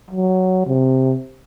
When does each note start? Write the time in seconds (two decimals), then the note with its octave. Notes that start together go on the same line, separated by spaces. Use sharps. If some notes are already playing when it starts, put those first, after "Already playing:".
0.11 F#3
0.67 C3